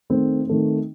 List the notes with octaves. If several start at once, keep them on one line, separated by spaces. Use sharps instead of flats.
D#3 A3 C4
D#3 A3 C4